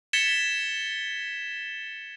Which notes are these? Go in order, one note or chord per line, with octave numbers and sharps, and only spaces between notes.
G#6 A6 B6 C#7 E7 G7